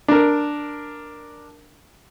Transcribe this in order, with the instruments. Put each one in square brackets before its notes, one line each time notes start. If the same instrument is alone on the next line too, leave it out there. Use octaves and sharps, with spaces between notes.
[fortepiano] D4 A#4